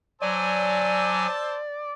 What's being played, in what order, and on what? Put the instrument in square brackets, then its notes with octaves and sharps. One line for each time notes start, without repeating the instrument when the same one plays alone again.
[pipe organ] F#3 G#5 [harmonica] C5 A5 E6 [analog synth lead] D5